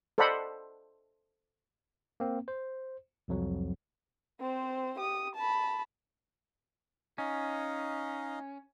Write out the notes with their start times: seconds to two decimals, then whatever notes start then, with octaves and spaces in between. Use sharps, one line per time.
0.18 A4 C5 D5 D#5 F#5 B5
2.20 A#3 C4
2.48 C5
3.28 C2 F2 F#3
4.40 C4 C5
4.99 G4 D#6
5.35 A5 B5
7.18 C#4 D#4 D#5 F5